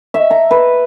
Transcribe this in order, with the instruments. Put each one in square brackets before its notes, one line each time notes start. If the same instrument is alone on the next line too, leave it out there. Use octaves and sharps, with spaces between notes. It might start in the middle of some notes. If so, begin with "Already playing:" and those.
[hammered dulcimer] E5
A#5
B4